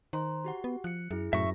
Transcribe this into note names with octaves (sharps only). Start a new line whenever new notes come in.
D#3 C5 A#5 C6
F#4 G4 F#5
B3
F3 F#6 C#7
F#2 E4 G#4
F#2 A2 E5 C#6 A#6